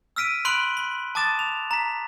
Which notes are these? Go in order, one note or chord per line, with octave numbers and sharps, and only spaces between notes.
E6 F6 B6 D7 D#7
B5 C6 F#6 D7 F#7 G7
C6
A5 D6 D#6 A6 E7
F7
A#5 B6